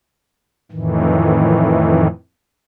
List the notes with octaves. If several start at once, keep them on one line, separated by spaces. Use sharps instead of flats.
F2 A2 D#3 E3